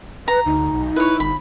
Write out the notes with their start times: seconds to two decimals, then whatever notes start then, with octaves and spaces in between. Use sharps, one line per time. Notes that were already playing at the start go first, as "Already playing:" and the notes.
0.28 B4 A#5
0.46 D2 D#4
0.73 B1
0.96 E4 B4 C#5
1.20 G1 B5